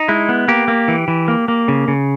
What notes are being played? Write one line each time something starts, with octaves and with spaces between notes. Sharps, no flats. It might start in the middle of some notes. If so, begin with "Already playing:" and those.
Already playing: D#4
G#3 E4
B3
A#3 G4
A#3
E3
E3
A#3
A#3
C#3
C#3